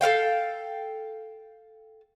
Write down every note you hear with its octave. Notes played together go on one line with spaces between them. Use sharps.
A4 A#4 F5 G5